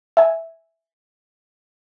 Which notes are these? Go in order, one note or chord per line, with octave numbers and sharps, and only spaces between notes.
E5 G#5